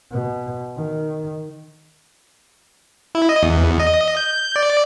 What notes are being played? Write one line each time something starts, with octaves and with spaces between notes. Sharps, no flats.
B2
D#3
E4
D#5
E2
D#5
G6
D5